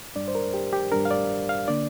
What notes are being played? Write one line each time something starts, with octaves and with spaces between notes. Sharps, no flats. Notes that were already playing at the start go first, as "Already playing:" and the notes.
G2 G3 D4 D5
C5
A#4
G4
G4
G2 G3 D4 A#4
F5
D5
F5
D3 A#3 D4 D5